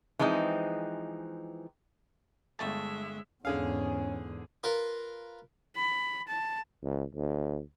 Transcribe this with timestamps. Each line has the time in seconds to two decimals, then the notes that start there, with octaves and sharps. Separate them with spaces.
0.19 E3 F3 G#3 C4 D#4
2.59 G1 G#3 A3 E5 A5
3.45 E2 G#2 D3 C#4 G#4 F5
4.64 F4 A#4 B4
5.76 B5
6.27 A5
6.82 C#2
7.15 D2